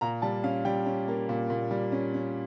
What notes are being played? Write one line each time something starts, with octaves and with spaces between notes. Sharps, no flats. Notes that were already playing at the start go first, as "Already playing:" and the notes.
A#2 A#5
G3 A5
C#4 F5
G3 G5
C#4
A#3
A#2
A#2
G3
C#4
C#4